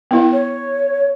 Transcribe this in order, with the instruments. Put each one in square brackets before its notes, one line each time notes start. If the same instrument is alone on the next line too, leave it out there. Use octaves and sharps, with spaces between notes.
[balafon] B3 E4
[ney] C#5